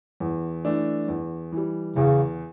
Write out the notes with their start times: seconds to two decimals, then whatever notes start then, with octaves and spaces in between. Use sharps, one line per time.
0.20 E2
0.65 E3 A3 D4
1.08 E2
1.52 E3 G3
1.96 E2 C#3